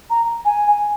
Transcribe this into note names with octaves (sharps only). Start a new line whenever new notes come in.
A#5
G#5